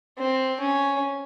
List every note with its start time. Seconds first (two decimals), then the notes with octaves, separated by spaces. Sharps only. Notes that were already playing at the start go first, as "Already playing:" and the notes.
0.18 C4
0.61 C#4